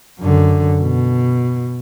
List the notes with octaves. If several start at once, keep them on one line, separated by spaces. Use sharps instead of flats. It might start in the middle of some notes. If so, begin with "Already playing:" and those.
F#2 D3
B2